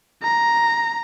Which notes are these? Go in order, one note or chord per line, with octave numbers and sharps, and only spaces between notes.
A#5